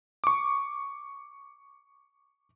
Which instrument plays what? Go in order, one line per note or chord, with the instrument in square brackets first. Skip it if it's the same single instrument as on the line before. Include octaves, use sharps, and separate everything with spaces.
[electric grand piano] C#6 D6